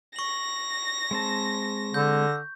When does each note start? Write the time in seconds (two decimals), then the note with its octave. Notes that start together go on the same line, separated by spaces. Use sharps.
0.16 C#6 A#6 F#7
1.11 G#3 C4 A5
1.94 D3 G6